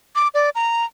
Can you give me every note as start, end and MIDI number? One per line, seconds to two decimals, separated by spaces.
0.15 0.28 86
0.34 0.50 74
0.55 0.85 82